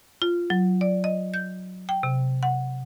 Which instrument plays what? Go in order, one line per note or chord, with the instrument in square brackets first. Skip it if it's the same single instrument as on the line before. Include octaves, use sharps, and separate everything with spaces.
[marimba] F4
F#3
D5
D#5
G6
G5
C3
F#5